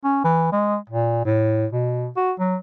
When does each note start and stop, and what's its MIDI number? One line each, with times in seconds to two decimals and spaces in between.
0.04 0.24 61
0.24 0.50 52
0.52 0.77 56
0.90 1.22 46
1.25 1.66 45
1.72 2.08 47
2.16 2.32 66
2.39 2.56 54